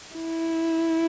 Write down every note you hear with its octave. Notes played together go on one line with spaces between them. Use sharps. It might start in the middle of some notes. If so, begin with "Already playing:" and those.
E4